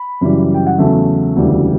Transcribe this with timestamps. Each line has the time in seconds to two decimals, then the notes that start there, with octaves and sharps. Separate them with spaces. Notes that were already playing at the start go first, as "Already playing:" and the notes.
Already playing: B5
0.21 F#2 C#3 E3 G3
0.54 G5
0.67 F#5
0.79 E2 C#3 F#3 A3 E5
1.36 E1 D2 C#3 E3 G3